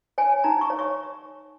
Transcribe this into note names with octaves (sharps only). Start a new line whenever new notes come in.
C#5 G#5
D#4 A#5
C#6
C#5
C#6